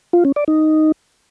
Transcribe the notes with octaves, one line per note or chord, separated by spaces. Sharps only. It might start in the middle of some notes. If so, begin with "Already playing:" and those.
F4
C#4
D5
D#4